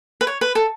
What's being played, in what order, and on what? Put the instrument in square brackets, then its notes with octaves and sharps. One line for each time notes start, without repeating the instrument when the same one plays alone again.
[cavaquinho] B4
C#5
B4
A4